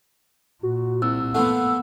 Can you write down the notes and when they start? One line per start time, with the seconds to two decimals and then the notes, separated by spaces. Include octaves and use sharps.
0.63 A#2 F#4
1.02 C2 C4 E4 E6
1.35 A#2 F3 A3 B3 F#5